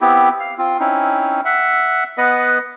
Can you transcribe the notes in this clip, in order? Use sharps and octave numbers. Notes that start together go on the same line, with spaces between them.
B3 C4 E4 G4
F5
C4 F4
C4 C#4 D#4 E4
E5 F#5
B3 B4 D#5 F#5